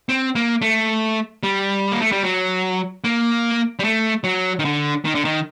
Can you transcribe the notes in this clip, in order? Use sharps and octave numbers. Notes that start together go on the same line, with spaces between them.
C4
A#3
A3
G3
A#3
A3
G3
F#3
A#3
G3
A3
F#3
D#3
D3
D#3
D3
D#3